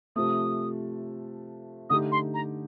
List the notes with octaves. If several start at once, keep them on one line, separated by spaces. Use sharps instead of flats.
C3 F3 A3 D#6
D3 A3 D#4 G4 D#6
C6
A#5